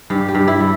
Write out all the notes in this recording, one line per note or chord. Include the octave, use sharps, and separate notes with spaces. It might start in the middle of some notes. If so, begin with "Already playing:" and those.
G2 G4
G4
G2
E4
G3